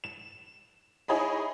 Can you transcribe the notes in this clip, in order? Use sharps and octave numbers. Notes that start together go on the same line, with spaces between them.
E7
D#4 E4 G#4 C#5 D#5 B5